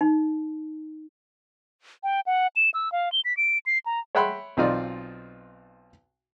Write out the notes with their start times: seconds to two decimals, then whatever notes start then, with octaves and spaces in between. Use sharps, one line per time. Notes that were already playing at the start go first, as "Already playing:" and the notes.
0.01 D#4
2.03 G5
2.26 F#5
2.56 E7
2.74 E6
2.92 F5
3.12 G7
3.25 B6
3.37 D7
3.66 C7
3.86 A#5
4.15 C#5 E5 F#5 G5 B5 C6
4.57 B1 C4 D#4 F4 D5